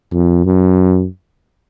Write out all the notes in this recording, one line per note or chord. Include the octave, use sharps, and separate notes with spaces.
F2
F#2